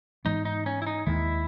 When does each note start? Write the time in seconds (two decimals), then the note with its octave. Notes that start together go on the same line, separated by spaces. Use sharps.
0.25 G#2 E3 G#3 B3 D#4
0.45 D#4
0.66 C#4
0.82 E4
0.87 D#4
1.06 D#2 D#3 G#3 E4